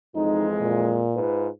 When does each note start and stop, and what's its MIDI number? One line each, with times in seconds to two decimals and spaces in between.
0.16 1.08 41
0.16 1.08 52
0.16 1.08 56
0.16 0.46 63
0.61 1.20 46
1.15 1.49 44
1.15 1.49 65
1.15 1.49 71